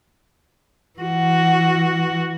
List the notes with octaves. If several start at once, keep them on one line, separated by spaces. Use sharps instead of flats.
E3 F#4